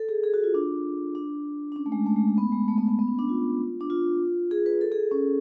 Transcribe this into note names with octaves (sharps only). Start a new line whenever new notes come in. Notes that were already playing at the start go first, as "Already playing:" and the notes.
Already playing: A4
G#4
G#4
F#4
F4
D4
D4
D4
C#4
A3
G#3
A3
G#3
A3
B3
G#3
A3
B3
B3
B3
C#4
D4
F4
D4
F4
G#4
B4
A4
G#4
C#4